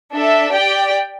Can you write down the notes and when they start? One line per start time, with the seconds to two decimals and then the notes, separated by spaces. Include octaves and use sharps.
0.13 D4 A4 E5
0.53 G4 D5 G5